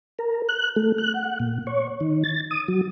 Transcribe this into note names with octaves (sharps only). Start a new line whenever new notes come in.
A#4
F#6
A3
F#6
F#5
A#2
C#5
D#3
A6
D#6
F#3